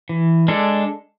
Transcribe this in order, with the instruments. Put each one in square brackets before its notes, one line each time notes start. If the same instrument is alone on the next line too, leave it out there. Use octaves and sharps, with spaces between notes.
[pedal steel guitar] E3
G#3 D4 A4